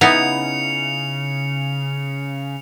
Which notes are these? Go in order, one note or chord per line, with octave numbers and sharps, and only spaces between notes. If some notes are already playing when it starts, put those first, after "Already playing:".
C#3 B3 D#4 E4 C#7 F7